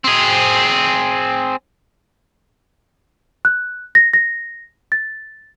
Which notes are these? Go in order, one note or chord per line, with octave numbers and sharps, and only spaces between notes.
C4 G#4
F#6
A#6
A#6
A6